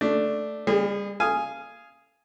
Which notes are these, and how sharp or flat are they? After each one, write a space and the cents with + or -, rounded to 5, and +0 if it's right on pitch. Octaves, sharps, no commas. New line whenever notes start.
A3 +0 D4 +0
G3 +35 G#4 -20
F5 -15 G#5 +0 D#6 +0